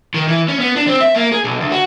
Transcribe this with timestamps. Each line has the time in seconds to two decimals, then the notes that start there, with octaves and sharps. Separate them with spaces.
0.14 D#3
0.28 E3
0.48 C#4
0.60 B3
0.76 D4
0.87 C4
1.01 E5
1.15 A#3
1.32 G#4
1.44 B1
1.60 D2
1.72 F#4